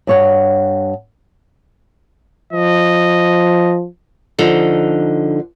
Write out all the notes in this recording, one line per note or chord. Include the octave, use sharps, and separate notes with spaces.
G2 C#5 F#5
F3 D#5
D3 F3 D#4